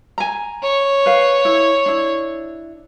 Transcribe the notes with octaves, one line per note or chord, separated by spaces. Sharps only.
G#5 A#5
C#5
B4 F5
E4
D4 E4